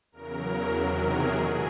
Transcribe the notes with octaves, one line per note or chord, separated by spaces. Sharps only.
E2 C#3 F#3 A#4
E2 C3 D#3 F#3 A#4
G#4
B2 F#3 A3 G#4